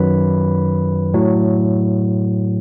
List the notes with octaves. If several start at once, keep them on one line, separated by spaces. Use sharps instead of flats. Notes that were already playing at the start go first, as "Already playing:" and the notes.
Already playing: F#2 D#3 F#3 B4 B5
A2 F#3